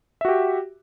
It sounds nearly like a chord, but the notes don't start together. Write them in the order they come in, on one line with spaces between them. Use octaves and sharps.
E5 F#4 G4